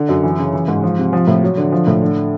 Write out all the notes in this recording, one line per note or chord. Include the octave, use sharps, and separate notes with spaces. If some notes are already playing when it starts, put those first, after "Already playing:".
Already playing: D3
F#2
E3
C#3
E3
G#2
F3
C3
F3
A2
F#3
D3
F3
A2
D3